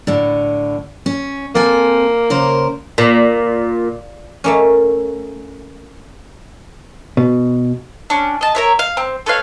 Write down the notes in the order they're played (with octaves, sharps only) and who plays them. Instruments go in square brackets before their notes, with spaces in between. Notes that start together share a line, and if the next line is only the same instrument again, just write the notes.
[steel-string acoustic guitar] A2 D3
C#4
[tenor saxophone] A#3 [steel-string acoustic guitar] C4 A4 G#5
[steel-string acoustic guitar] C#3 A#4 C5
[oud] A#2
[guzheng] A3 A#3 C#4
[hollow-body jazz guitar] B2
[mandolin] C#4 D4
D#5 A5
A#4 C#5 E5
F5
C4
A4 B4 C#5 F5